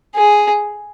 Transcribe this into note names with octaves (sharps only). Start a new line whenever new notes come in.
G#4